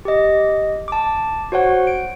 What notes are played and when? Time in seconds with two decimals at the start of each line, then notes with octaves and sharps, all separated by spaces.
0.05 G4 D#5
0.88 A5 D6
1.52 F#4 C5 C#5 F#5
1.87 D7